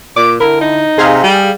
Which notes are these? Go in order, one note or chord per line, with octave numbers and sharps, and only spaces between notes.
A#2 D6
D3 E4 A#4
D#4
C3 G#4 F5
G3